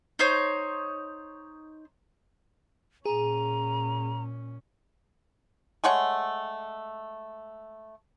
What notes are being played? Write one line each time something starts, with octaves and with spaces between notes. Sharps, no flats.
D#4 C5 C#5
A#2 C#4 G#4 A#5
G#3 A3 C#5 F#5